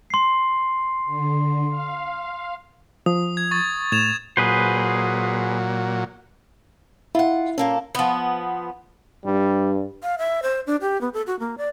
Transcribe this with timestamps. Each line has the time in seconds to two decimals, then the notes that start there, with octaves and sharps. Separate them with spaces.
0.10 C6 C7
1.06 D3
1.70 F5
3.06 F3 D#6
3.37 G#6
3.51 C#6 A6
3.92 A2 G#6 E7 F7
4.37 A#2 F#3 G#4 B4 C5
7.15 E4 F4 F#5
7.58 A#2 A#3 C#4 A4
7.95 F3 B3
9.25 G2 G3
10.03 F5
10.18 E5
10.43 C5
10.67 D4
10.81 G4
11.01 B3
11.14 A4
11.27 F#4
11.39 A#3
11.58 D5